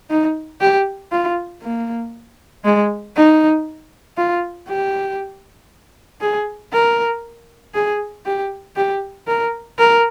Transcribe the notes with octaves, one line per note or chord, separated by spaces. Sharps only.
D#4
G4
F4
A#3
G#3
D#4
F4
G4
G#4
A#4
G#4
G4
G4
A#4
A#4